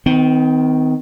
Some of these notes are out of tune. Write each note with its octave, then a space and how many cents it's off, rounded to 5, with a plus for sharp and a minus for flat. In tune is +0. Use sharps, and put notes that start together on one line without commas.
D#3 +15 C4 -40